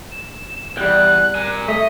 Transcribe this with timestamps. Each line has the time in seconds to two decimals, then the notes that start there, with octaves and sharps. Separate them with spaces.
0.11 E7
0.77 E2 G3 G5 F#6
1.35 A#4 G#5
1.68 A3 D#5 B6